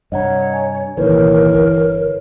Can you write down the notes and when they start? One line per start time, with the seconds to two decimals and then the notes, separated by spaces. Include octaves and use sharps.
0.12 G2 C3 C#5 D#5 F#5 A#5
0.53 G#5
0.97 C2 A#2 D#3 E3 A#4 B4 C#5
1.51 G1